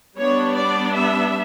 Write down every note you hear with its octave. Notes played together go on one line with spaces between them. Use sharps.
G3 B3 D4 C#5
D5
E5